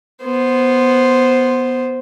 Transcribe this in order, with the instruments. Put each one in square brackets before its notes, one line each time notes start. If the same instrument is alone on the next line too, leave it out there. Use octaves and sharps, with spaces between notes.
[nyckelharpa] B3 C5